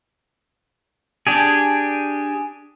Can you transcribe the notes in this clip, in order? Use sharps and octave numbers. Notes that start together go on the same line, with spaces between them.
D4 G4 G#4